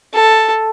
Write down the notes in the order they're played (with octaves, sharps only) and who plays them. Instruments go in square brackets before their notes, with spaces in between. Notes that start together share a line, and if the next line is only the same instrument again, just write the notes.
[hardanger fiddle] A4